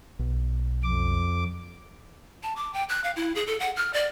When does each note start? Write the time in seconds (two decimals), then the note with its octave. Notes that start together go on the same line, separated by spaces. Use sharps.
0.19 B1
0.83 F2 D6
2.43 A5
2.56 D6
2.74 G5
2.89 F#6
3.04 F5
3.16 E4
3.35 G#4
3.47 A4
3.60 F#5
3.76 F6
3.94 D5